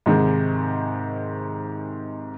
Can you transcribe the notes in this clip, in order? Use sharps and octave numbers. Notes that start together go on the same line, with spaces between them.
G#2 C3 D#3 G#3